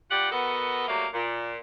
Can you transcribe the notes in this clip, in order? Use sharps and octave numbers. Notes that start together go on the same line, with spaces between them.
G3 F4 G4 D5 F#5
B3 F#4 A4 A#4 D#5
F#3 G3 A3 A#3
A#2